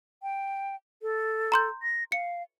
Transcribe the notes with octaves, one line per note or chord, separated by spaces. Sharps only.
G5
A4
A#5 C6 G6
A#6
F5 C#7